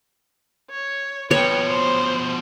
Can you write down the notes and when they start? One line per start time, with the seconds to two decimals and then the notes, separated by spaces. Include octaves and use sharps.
0.70 C#5
1.31 B2 F3 B4 C#5 G5
1.67 C5